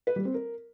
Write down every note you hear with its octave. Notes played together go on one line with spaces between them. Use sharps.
B4
G3
C4
A#4